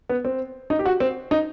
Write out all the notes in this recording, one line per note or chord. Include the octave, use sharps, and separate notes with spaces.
B3
C4
D#4
G4
F#4
C4
D#4